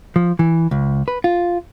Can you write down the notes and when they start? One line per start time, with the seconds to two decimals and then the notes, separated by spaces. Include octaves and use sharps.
0.16 F3
0.39 E3
0.71 C#2
1.08 B4
1.24 F4